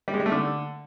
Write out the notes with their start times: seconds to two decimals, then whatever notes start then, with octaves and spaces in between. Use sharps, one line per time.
0.08 G3
0.14 G#3
0.20 G3
0.26 A3
0.32 D3